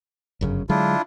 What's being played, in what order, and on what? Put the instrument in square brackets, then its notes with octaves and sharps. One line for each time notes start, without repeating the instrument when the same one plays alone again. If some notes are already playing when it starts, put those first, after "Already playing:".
[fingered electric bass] G1 F#2 C#3
[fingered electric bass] D3 F#3 G#3 [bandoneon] D4 E4 F4